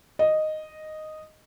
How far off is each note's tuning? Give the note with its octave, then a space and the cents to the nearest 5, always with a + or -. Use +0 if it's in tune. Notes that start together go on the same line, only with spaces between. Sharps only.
D#5 -5